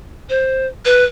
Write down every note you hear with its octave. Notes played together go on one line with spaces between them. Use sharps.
C5
B4